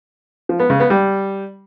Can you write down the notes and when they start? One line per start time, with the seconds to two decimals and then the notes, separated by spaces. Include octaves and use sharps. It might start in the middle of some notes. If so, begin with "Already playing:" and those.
0.49 F3
0.59 B3
0.70 C#3
0.80 B3
0.90 G3